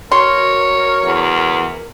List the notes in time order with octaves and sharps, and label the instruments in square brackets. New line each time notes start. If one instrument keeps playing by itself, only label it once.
[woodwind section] F#4 A#4 [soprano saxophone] C#5 [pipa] C6
[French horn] E2